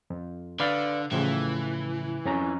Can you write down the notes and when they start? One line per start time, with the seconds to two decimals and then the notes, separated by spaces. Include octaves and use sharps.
0.10 F2
0.60 D3 B4 D5 F5
1.12 A2 C#3 E3 F3
2.25 F2 C#4 A#5